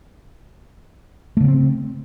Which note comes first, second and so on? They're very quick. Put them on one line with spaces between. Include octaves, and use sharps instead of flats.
A3 C#3 B3 C4